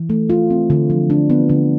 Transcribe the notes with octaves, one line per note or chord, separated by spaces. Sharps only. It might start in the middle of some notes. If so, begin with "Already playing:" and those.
Already playing: E3
A3
F4
C4
D3
F3
D4
B3
D3